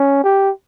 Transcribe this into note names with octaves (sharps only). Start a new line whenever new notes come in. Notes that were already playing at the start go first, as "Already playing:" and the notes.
Already playing: C#4
G4